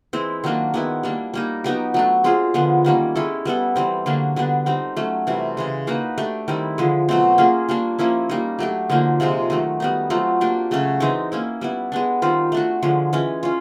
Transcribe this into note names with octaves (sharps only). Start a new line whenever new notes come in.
E3 G#3 C4 E4
D#3 F#3 A#3 D4
D#3 G#3 B3 E4
G3 A#3 D4
G3 A#3 D#4
F#3 B3 D#4 G4
F#3 A3 D4
G#3 C4 F4 G#4
D3 F3 G#3 B3
D#3 G3 A#3 C#4
G#3 C#4 E4 A4
G3 B3 E4 A4
E3 G3 C4
D3 F#3 A#3 D4
D3 G3 B3 D4
G3 C4 D#4
F#3 A3 C#4
C3 E3 G3
C#3 E3 G#3
A#3 D#4 F#4 B4
A3 D4 G4
D#3 G3 C4 E4
D3 F3 G#3
B2 F#3 A3 C4
A#3 C#4 F4 G#4
G3 A#3 D4
F3 A#3 C#4 E4
G3 A#3 D#4
F#3 A3 D4 G4
D3 F3 A#3 D#4
C3 F3 G#3 C4
D#3 F#3 A3
G3 B3 D#4
F#3 A3 C4 F4
A#3 D4 G4
C#3 F#3 A3 C#4
E3 G#3 C4 D#4
A#3 C#4 E4
G3 B3 E4
G#3 B3 D4
D#3 G3 C4 F4
A3 D4 F#4
D3 F3 G#3
E3 G#3 C#4
C#4 F4